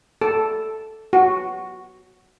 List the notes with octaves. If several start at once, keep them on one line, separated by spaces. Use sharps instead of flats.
A4
F#4